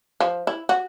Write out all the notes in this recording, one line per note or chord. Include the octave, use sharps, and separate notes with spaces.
F3
E4
F#4